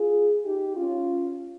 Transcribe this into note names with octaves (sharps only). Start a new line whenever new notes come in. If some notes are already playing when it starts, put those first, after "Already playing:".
Already playing: F4 G#4
D#4 G4
C#4 F4